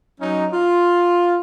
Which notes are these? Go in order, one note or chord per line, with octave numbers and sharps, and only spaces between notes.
F#3 C#4 D#4
F4